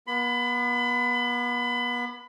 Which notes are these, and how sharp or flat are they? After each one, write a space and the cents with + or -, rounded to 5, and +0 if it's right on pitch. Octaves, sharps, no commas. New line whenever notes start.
B3 -40 B5 +30